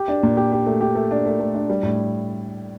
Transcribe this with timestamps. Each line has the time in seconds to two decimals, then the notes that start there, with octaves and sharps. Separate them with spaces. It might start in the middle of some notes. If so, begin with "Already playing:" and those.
Already playing: G4
0.08 D4
0.23 A#2
0.37 G4
0.52 G4
0.66 A3
0.81 G4
0.95 A3
1.11 D4
1.25 A3
1.39 A3
1.55 D4
1.70 G3
1.83 A2